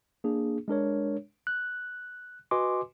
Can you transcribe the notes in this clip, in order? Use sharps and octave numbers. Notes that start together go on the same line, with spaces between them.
A#3 D4 G#4
G#3 D4 A#4 C#5
F#6
F#4 B4 D#5 G#5 C6 D6